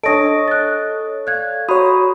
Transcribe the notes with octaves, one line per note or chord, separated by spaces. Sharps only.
D4 A4 C#5 D#5 D#6 A#6 D7
F#6 A6
D5 F5 F#6 G#6
F#4 C#5 A#5 B5 D#6